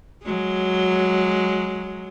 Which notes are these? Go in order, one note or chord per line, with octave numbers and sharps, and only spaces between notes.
F#3 G#3